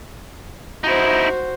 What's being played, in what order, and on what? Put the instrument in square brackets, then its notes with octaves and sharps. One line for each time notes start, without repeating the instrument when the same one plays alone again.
[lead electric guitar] D#4 E4 [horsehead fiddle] F#4 C5